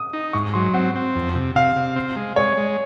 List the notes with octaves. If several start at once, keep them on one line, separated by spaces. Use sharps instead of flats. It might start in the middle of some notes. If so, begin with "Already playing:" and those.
Already playing: D#6
D#4
G#2 C#6
F#3 C6
C4 F#5
C4
F2
C3
C3 F5
C3
C4
G#3
G#3 C#5
G#3